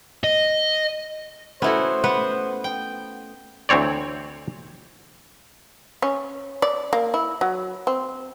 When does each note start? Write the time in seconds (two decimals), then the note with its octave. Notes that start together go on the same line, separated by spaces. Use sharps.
0.24 D#5
1.62 A3 B3 C#4 E4 F#4 C5
2.04 B3 B4 F#5
2.64 G5
3.69 D2 E3 C4 C#5 D5
6.02 C#4
6.62 D5
6.93 A#3
7.14 E4
7.41 F#3
7.87 C4